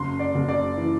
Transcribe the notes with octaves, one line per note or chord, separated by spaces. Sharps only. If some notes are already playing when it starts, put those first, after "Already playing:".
Already playing: F#1 C6
D5
F#1
D5
E3